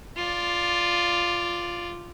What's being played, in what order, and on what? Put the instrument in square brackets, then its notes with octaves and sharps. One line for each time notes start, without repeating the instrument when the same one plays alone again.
[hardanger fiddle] F4 D5